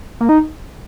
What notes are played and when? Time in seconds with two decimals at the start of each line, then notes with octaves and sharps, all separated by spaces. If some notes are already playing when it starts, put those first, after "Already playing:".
0.21 A#3
0.29 D#4